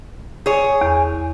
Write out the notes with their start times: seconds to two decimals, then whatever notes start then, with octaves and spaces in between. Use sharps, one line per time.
0.46 G#4 C#5
0.81 E2